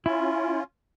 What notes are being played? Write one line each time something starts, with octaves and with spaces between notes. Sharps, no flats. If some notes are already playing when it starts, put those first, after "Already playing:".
C#4 E4 F4